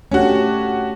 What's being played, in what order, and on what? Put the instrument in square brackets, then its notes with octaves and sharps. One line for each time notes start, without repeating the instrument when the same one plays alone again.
[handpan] A3 D4 G4 [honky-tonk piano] C#4 F#4